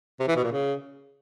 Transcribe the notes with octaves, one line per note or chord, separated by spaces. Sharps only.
C3
E3
B2
A#2
C#3